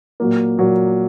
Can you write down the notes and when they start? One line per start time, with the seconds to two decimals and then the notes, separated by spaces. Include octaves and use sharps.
0.20 A#2 F#3 A#3
0.57 A#2 F#3 A#3